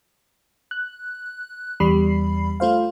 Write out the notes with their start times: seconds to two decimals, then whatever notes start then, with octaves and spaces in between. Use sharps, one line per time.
0.71 F#6
1.80 E2 G3 B5 C7
2.60 A3 F4 C5 F5